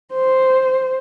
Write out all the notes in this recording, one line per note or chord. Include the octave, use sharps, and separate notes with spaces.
C5